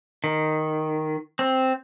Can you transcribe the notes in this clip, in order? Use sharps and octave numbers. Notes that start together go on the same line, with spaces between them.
D#3
C4